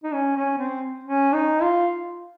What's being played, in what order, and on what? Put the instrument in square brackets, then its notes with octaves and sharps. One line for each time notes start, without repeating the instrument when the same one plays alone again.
[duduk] D#4
C#4
C#4
C4
C#4
D#4
F4